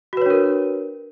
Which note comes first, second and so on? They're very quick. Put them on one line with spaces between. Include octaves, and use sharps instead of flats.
F#4 B4 C#5 D4 A#4